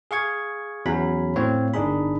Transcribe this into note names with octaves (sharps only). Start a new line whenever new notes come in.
G#4 F5 C#6 G#6
E2 F#3 C#4 B5
A2 C4 C#5 F5
G1 D4 D#4 G#4 B5